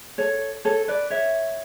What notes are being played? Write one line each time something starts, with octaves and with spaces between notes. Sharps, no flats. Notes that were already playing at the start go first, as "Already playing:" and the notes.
A4 C#5
A4 C#5
B4 D5
C#5 E5